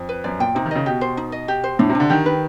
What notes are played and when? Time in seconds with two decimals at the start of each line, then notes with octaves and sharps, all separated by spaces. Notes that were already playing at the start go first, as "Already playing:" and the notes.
Already playing: F2
0.09 B4
0.24 F#2 D5
0.40 A#2 G5
0.55 C3 D#4
0.66 D#3
0.71 C#3 D#5
0.86 B2 G4
1.01 C5
1.17 D#4
1.32 D#5
1.48 G4
1.64 C5
1.79 A2 D4
1.89 C3
1.95 D4
2.00 D3
2.10 D#3 G4
2.26 B4